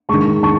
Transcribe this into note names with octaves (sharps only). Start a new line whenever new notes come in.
D#3 G#3 A5 C#6
D#3 A5 C#6